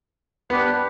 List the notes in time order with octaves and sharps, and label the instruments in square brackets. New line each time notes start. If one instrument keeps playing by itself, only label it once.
[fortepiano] B3 [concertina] D4 G4 B4